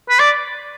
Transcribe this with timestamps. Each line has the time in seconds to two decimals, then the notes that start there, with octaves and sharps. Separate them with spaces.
0.09 B4
0.20 D5